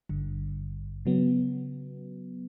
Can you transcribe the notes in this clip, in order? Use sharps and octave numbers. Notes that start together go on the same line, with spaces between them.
G#1 G2 D3
C#3 F#3 B3